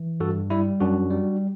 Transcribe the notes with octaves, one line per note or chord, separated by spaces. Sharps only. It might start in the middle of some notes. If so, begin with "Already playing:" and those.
Already playing: E3
G2 F#4 A4
G3 E4
F#2 D4 F#4
G3